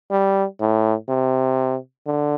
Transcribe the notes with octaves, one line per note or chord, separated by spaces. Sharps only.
G3
A2
C3
D3